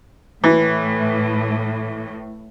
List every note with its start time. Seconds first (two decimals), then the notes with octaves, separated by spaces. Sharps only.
0.44 A2 E3